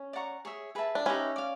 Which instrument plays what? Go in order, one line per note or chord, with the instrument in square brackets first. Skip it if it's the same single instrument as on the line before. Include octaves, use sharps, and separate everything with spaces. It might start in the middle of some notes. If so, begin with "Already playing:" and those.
Already playing: [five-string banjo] C#4
[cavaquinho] D5 F#5 A#5 C#6
G#4 C#5 E5
G#4 B4 E5 A5
[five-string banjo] D4
[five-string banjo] C#4 [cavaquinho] D#4 G4 B4 E5
[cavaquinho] D5 F5